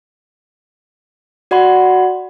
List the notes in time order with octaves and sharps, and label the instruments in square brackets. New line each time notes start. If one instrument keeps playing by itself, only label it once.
[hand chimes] F#4 D5 F#5 B5 C6